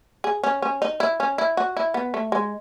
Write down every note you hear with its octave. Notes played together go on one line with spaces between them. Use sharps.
G#4
C#4
C#4
D#4
E4
C#4
E4
F#4
E4
B3
A3
G#3